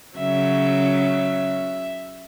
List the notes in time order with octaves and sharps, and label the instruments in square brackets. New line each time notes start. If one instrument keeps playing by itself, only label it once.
[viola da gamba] C#3 F#3 [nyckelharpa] E5